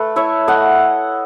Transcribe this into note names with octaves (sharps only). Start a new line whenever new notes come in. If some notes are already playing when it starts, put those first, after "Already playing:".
Already playing: A3 A4 B4
E4 C#5 E5
A3 D#5 F#5